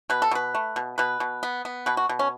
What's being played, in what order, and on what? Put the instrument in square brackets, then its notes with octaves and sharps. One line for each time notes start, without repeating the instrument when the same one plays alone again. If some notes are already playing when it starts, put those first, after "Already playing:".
[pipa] B2 B4
A4
B2 B4
A3
B2
B2 B4
B2
B3
B3
B2 B4
F#4
B2
C#4